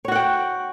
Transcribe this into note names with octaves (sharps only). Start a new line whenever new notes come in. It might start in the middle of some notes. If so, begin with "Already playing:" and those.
F#4 C#5 F#5 G5